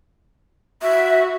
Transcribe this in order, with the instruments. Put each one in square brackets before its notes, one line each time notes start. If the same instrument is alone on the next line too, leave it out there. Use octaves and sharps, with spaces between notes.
[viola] F#4 [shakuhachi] E5